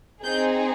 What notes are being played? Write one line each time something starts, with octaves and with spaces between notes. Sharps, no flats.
C4 D#4 G#4 G6